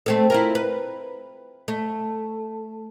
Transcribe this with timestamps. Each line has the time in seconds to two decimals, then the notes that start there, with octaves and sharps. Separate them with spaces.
0.06 A3 C4 A4
0.30 E4 F4 A#4
0.55 B4
1.68 A3